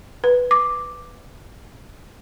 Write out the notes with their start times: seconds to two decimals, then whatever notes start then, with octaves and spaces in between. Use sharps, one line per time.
0.24 B4
0.51 D6